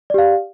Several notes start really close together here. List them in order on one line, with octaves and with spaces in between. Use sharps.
D5 G4 F5